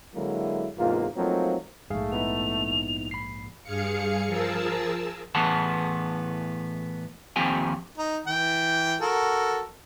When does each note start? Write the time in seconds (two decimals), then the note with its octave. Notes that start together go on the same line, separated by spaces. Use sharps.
0.15 D3 F#3 G#3 A#3 E4
0.78 E2 G#2 C3 A#3 F4
1.17 F3 F#3 A3 A#3 C4 D#4
1.90 A#1 G#2 A3 G#4 F5
2.12 B3 D#4 E4 F7
3.11 B5 C7
3.63 G2 G#4 F5 C#7
4.27 F3 G#4 A#4 A5 E6
5.35 A2 E3 B3 G#4 F#5 A5
7.36 D#2 F3 C4 G4 G5 G#5
7.98 D#4
8.27 E3 G5
9.01 F#4 A4 A#4